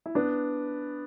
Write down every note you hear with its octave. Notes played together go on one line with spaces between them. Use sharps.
E4
B3 D4